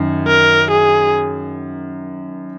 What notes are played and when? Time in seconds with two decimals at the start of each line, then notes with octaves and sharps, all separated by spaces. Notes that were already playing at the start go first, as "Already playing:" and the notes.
Already playing: F#2 D#3
0.27 A#4
0.72 G#4